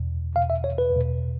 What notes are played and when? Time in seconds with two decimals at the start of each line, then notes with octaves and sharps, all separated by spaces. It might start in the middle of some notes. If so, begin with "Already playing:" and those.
Already playing: E2 B2
0.36 E2 B2 F5
0.50 E5
0.64 C#5
0.78 B4
0.92 E2 B2